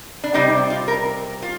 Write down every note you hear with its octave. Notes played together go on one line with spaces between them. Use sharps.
D4
C3 G3 C4 D#4
F4
A#4
F4